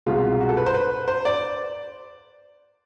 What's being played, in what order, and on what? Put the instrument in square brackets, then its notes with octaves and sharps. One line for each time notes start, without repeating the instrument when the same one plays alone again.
[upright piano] C2 B2 G#3 F4
F#4
A4
B4
C5
B4
C5
D5